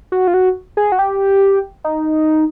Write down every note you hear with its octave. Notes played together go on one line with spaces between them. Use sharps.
F#4
F4
F#4
G#4
F#4
G4
D#4